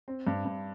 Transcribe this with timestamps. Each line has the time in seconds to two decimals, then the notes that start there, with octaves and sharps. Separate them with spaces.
0.08 C4
0.27 G2
0.45 G2